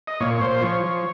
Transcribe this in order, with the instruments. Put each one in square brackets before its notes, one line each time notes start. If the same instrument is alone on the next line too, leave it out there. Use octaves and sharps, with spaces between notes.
[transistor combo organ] D#5
A#2 C#5
A#2 C5
F3 C#5
F3